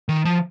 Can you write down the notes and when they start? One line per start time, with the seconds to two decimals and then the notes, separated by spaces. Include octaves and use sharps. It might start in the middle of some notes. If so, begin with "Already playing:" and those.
0.09 D#3
0.25 F3